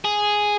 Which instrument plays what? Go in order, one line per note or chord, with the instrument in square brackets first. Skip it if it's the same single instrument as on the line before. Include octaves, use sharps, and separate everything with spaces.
[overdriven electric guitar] G#4